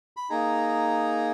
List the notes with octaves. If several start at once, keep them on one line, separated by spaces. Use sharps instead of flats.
B5
A#3 D#4 G#4 A#5